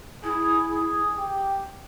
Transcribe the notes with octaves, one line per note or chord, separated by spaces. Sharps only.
E4 G#4
G#4
G4